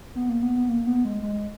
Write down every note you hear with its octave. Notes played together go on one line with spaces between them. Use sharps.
B3
A#3
B3
B3
A#3
B3
G#3
G#3